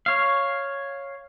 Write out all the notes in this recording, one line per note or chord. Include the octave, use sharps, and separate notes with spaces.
C#5 F5